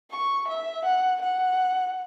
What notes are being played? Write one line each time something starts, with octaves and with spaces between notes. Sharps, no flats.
C#6
E5
F#5
F#5